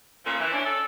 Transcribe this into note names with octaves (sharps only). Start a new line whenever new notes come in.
A#2 F3 A3 C#4
E3
C#4 D4
A4